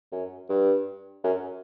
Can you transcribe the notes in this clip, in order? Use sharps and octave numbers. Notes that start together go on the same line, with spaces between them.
F#2
G2
F#2